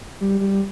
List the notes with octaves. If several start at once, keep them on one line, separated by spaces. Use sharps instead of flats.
G3
G3